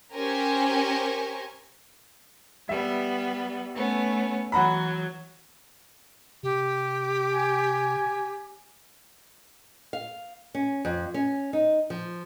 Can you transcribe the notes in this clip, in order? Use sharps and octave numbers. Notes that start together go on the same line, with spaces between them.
C#4 G4 A#4 C5 G#5 C#6
G3 B3 E5
A3 B3 C#4
E3 F#3 F#5 A#5 B5
C3 G4
G#5
F5
C#4
F2
C#4
D#4
F3